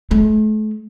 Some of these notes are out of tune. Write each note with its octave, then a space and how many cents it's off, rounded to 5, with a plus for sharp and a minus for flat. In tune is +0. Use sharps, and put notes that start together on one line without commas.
A3 -40